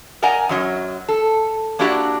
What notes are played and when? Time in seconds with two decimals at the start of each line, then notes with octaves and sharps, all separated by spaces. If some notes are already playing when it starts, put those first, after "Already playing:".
0.22 A#4 D5 D#5 F#5 G#5 A#5
0.49 F#2 F#3 D#5
1.09 A4
1.79 A#3 D4 E4 F#4 G4 D5